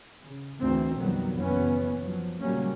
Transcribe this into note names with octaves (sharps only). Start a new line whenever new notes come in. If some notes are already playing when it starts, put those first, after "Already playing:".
C#3
D2 G#2 E3 C4
B1 F2 D#3 F#3 G3 B3
F#1 E3 B3 C#4
F3 F#3
A#1 C#3 F#3 G3 A#3 C#4